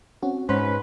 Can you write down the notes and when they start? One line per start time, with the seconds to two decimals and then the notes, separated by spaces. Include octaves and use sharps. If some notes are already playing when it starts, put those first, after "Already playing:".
0.23 C4 C#4 F#4
0.49 G#2 C#4 B4 C5